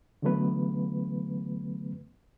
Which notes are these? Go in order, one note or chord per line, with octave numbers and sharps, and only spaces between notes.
D3 E3 F#3 A3 B3 B4